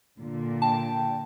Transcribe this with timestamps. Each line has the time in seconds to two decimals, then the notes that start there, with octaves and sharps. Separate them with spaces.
0.21 A#2 D3
0.62 G5 A5